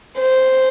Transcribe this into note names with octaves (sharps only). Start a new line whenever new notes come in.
C5